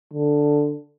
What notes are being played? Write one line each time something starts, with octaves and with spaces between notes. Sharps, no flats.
D3